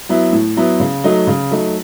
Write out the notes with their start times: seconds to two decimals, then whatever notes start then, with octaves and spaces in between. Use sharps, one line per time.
0.09 F#3 B3 E4
0.33 A2
0.57 F#3 B3 E4
0.80 C#3
1.04 F#3 A3 D#4
1.27 C#3
1.51 F#3 A3 D#4